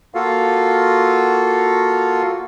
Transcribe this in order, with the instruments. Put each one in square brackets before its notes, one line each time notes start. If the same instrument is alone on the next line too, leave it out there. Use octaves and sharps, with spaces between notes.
[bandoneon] A#3 F4 F#4 A4 F5